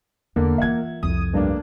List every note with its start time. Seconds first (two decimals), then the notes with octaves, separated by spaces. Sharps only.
0.36 E2 D3 A#3
0.58 E3 F4 E5 F#5 G#6
1.03 C2 F2 D#6
1.33 G2 A3 A#3 D4